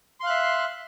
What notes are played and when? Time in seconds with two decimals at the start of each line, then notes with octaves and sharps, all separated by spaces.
0.20 C6
0.23 F5
0.26 F#6
0.29 E5